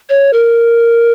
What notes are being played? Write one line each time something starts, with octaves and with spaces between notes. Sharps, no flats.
C#5
A#4